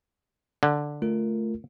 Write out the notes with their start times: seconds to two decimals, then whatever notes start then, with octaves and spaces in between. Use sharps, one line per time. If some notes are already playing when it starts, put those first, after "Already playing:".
0.63 D3
1.02 A3 F4 A#4